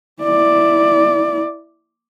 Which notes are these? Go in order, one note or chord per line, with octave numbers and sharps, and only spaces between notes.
E4 D5